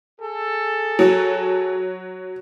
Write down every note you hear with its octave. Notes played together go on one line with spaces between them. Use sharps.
G#4 A4
F#3